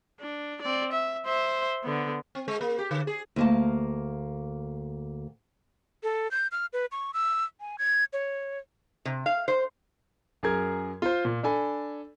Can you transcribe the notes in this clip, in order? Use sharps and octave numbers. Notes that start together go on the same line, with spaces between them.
D4
C4 D5
E5
C5 E5
D3 B3
C4
G#3
A#3
G4
D3
G#4
D2 A#3 A5
A4
G6
F6
B4
C#6
E6
G#5
G#6
C#5
C3
F5
C5
F#2 G#4 A#4 G#6
F4 C5
A#2
D4 A4 G#5 B5